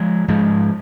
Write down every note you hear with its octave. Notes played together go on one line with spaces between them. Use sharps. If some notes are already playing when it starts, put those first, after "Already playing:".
Already playing: F3 G#3
G#2 F3 G#3